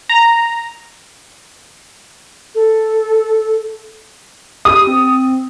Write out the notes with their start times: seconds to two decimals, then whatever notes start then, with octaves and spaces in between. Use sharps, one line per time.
0.09 A#5
2.55 A4
4.65 G4 D#6
4.87 C4